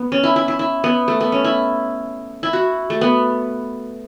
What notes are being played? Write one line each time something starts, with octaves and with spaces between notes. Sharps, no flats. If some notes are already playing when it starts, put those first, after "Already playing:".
Already playing: B3
C#4
E4
E4
E4
E4
B3
A3
B3
C#4
E4
E4
F#4
A3
B3